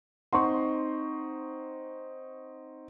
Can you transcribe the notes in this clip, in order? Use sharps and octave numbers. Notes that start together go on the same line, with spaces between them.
C4 D#4 F#5 C6 C#6